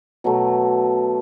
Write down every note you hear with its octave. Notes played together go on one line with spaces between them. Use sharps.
B2 F#3 A3